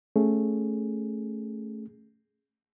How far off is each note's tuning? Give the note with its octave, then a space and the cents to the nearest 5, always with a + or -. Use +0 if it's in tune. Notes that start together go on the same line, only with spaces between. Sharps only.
A3 +0 C#4 +0 G#4 +0